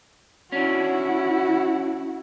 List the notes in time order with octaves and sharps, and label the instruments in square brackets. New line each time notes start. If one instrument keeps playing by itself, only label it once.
[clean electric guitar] C#4 D4 [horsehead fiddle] E4 F#4